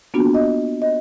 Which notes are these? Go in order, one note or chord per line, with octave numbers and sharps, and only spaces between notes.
A#3 B3 D4 F4 F#4
D#5
D#5